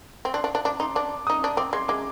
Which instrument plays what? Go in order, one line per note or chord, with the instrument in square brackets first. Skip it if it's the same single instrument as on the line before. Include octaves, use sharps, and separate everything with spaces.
[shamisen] C4
[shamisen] D4 [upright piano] C6
[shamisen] D4
D4
[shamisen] D4 [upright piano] D6
[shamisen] D#4 [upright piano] C6
[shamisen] D4 [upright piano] D6
[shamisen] D#4 [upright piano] D#6
[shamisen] D4
[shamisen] C4 [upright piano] D6
[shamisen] G#3 [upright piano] C6
[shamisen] G#3 [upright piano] D6